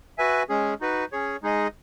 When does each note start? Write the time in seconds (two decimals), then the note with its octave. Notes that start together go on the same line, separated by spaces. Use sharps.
0.18 F#4 B4 E5 G#5
0.49 G#3 C#4 G#4
0.81 D#4 F#4 B4
1.12 C#4 G#4 C#5
1.42 G#3 D#4 G#4 D#5